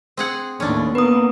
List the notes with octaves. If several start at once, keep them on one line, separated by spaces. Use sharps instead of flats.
C4 G#4 F#5
D#2 A2 C#4 D4
A#3 B3 B4 D#6